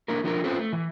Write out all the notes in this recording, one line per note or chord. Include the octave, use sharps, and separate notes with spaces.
A#3 D4 E4 A#4
F3 D4 E4 A#4
C4 C#4 F4 A4 B4 C5
A3
E3